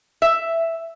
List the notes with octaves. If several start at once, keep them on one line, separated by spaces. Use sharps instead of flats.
E5